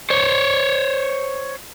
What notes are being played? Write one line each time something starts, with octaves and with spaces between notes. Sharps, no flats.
C5 C#5